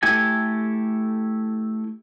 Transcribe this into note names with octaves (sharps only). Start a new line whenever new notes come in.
A3 E4 G4 A4 G#5